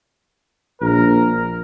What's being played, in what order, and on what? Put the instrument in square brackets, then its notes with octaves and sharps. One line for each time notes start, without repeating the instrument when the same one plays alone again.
[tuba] A#1 [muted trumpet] A#4